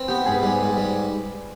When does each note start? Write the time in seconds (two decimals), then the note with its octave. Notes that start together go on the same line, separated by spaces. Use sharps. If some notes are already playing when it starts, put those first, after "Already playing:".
Already playing: C4 B4
0.08 B3 G4
0.26 G#2 G#4
0.33 B4
0.42 G3 G#4
0.61 G#2
0.77 G3